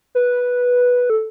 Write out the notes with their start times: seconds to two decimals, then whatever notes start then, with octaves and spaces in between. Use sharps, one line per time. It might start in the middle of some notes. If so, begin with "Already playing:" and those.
0.15 B4
1.10 A4